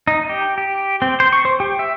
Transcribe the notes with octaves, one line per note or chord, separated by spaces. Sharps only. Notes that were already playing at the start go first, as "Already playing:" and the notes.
D#4
G4
G4
C4
C5
C#6
C5
G4
E5